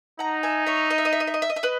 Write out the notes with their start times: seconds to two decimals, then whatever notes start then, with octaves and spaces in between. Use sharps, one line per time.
0.19 D#4 F#5 A#5
0.43 E5 G#5
0.66 C#5 E5
0.90 D#5
0.98 E5
1.05 D#5
1.13 E5
1.20 D#5
1.27 E5
1.34 D#5
1.42 E5
1.50 D#5
1.56 E5
1.63 B4 D#5